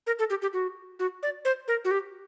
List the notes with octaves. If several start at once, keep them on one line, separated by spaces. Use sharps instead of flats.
A#4
A4
G4
G4
F#4
F#4
D5
C5
A#4
F#4
G4